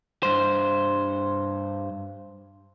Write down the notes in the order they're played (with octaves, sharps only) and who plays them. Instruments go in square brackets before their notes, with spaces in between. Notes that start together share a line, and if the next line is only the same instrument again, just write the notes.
[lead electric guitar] G2 C5